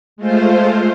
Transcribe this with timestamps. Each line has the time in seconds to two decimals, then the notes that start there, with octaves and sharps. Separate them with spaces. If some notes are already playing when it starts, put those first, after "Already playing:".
0.16 G#3 A3 F4 C5